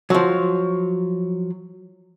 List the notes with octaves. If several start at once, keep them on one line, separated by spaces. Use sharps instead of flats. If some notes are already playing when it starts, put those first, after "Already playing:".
F3 F#3